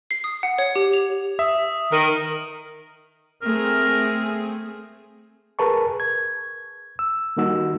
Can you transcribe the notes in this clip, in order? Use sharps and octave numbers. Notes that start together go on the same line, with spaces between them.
C7
D#6
F#5
C#5
G4
F7
E5 D#6
D#3 A#4 F6 D#7 F#7
A3 C4 G#4 A#4
G#4 A#4 B4 A5 C#6
G#6
E6
D#3 G3 A#3 D#4 F#4 E6